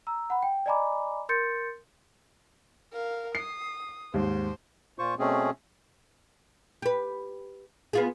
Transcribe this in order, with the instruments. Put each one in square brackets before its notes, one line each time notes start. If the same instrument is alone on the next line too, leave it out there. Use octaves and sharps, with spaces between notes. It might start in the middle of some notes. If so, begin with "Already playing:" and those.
[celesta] A#5 E6
F#5 B5
G5
D5 D#5 G#5 A#5 B5 D6
A#4 C6 G6 A6 C#7
[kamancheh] A#4 F5
[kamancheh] D#6 [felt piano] C7
[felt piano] D#2 G#2 [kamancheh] C5
[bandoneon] A#2 F4 C5 C#6
B2 A3 C4 C#4 G#4
[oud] G4 B4
B3 F4 G#4